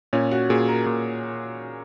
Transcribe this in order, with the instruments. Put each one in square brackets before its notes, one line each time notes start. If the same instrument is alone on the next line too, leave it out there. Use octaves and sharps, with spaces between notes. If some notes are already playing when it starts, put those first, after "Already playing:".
[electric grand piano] A#2 [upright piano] C#4
[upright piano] F#4
[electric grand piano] A#2 [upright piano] G#4
[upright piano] A#4
[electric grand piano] A#2